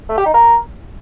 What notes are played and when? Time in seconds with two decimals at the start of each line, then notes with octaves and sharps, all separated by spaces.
0.09 A3
0.17 G4
0.26 D#4
0.34 A#4